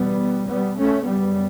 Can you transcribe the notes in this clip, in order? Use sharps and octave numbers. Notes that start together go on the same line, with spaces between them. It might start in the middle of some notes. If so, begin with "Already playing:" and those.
Already playing: E2 B2 G3 B3
G3 B3
A3 C#4
F#2 C#3 G3 B3